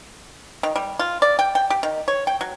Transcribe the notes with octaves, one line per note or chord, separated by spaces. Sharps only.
D#3
G3
F4
D5
G5
G5
G4
D#3
C#5
G5
F#3